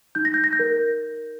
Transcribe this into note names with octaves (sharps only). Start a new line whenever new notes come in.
D#4 G6
A#6
G6
A#6
G6
A#4